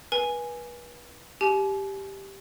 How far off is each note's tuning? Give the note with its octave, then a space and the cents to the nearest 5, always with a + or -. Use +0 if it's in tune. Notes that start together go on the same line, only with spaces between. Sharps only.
B4 -35 G#5 +0
G4 +0 G#5 +45